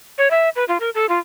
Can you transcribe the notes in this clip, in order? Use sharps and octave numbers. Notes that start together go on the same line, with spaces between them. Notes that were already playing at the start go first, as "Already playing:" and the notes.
C#5
E5
B4
F4
A#4
A4
F4